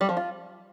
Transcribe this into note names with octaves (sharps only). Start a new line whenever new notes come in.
G3
F3
F4